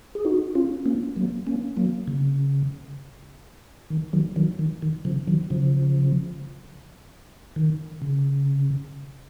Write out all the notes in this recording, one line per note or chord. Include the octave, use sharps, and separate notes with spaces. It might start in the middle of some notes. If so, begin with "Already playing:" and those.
G#4
D#4 F#4
C#4 F4
A#3 C#4
F#3 A#3
A#3 C#4
F#3 A#3
C#3
D#3
D#3 F#3
D#3 F#3
D#3
D#3
C#3 F3
D#3 F#3
C#3 F3
D#3
C#3